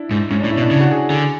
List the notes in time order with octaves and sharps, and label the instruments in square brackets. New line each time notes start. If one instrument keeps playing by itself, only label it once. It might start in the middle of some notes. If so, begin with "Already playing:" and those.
Already playing: [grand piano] D4 E4
[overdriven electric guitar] G#2
[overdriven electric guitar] G#2 [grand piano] C#4
[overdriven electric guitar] A2 [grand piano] D4
[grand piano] E4
[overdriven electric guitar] B2
[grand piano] D4
[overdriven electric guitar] C#3 [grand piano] D4
[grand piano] F#4
G#4
[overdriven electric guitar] D3 [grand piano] G#4